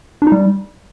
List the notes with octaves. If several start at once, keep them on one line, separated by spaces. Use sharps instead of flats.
D4
D#4
G3